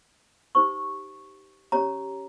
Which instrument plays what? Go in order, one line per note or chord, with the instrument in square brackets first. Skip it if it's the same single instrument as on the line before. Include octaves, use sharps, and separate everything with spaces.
[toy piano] D#4 G4 C5 C#6
C#4 G4 C#5 A#5